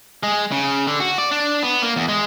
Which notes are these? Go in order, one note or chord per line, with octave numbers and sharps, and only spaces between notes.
G#3
C#3
D3
F#4
D5
D4
B3
A#3
E2
G#3